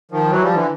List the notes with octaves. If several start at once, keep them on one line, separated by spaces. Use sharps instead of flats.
D#3 F3
E3 F#3
F3 G3
D3 E3